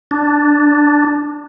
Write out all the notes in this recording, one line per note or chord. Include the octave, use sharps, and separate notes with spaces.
D4